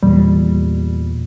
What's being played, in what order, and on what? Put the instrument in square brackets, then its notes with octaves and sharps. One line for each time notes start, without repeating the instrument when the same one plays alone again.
[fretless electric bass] E2 A#2 [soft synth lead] G3